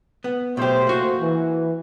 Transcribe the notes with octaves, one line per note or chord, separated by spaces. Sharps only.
B3
B2 F#3 A3 G4 C5
A#3 F#4
E3